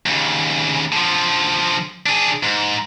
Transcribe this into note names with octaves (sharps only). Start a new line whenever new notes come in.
D#2 C#3
D3 F3
D4 G#4
G#2